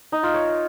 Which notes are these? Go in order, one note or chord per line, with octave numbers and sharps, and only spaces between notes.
D#4
F4
C#5